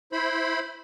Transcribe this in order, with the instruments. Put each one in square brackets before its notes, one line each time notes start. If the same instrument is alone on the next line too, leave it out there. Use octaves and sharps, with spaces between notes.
[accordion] E4 C5 B5